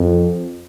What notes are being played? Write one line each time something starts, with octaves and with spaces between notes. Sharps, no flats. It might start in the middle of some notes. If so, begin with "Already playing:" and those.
Already playing: F2